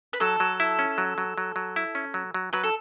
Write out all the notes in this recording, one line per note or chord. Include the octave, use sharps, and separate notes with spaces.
B4
F#3 A4
F#3
E4
C#4
F#3
F#3
F#3
F#3
E4
C#4
F#3
F#3
F#3 B4
A4